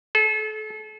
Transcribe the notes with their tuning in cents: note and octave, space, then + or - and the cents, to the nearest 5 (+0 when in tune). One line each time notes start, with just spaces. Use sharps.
A4 -35